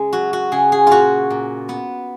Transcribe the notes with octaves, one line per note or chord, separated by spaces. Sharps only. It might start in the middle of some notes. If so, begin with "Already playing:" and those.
Already playing: C#3 G#3
F#3 F#4
F#4
C#3 G#4
G#4
A#2 F4 F#4
A#2
B3